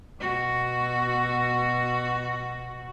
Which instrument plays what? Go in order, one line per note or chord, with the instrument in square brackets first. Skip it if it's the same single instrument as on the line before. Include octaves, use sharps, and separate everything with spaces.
[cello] B2 F#4